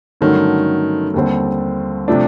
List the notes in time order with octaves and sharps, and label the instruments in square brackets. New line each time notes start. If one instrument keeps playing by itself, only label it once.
[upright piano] G2 D3 F#3 A3 C#4 [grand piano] D#3
[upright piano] D#2 D3 G3 C4
C3 F3 A3 D4